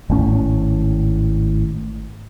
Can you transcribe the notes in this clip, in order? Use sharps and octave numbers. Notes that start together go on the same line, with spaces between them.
G#1 A2 C#4